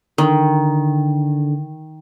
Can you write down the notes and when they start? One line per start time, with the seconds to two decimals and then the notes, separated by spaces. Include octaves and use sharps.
0.18 D3 D#3